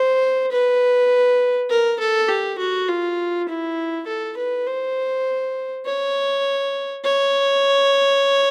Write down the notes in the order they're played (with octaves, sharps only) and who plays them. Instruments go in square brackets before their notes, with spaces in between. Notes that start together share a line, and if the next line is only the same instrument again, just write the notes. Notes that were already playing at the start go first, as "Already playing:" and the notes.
Already playing: [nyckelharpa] C5
B4
A#4
A4
G4
F#4
F4
E4
A4
B4
C5
C#5
C#5